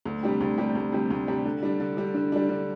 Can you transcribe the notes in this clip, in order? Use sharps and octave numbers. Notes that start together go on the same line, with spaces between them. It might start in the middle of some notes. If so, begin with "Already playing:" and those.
D2
C3 G3 D4 G4
D2
C3 G3 D4 G4
D2
C3 G3 D4 G4
D2
C3 G3 D4 G4
D3
G3 D4
D3
G3 D4
D3
G3 D4
D3